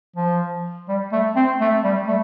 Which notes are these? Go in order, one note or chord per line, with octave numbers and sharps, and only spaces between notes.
F3
G3
A3
C4
A3
G3
A3